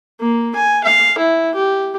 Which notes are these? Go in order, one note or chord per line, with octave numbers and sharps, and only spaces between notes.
A#3
G#5
F5
E4
G4